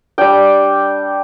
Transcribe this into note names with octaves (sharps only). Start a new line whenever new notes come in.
G3 D4 G5